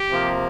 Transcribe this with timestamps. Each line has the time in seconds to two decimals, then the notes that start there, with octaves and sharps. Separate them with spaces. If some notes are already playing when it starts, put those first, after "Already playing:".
Already playing: G4
0.10 C3 F3 A#3